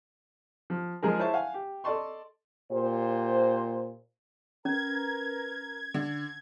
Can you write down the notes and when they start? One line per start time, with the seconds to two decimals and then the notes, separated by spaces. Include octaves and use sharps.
0.70 F3
1.02 F3 G#3 G#4 A#4
1.19 E4 C5 C#5 E5 A5
1.34 F5 F#5 G#5
1.54 G4
1.84 A4 D5 D#5 A5 C6 C#6
2.72 A#2 G4 C5
4.65 C#4 A#4 B4 A#5 G#6
5.94 D3